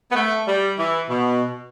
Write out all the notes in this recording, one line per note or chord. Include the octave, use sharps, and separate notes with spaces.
B3
A3
G3
E3
B2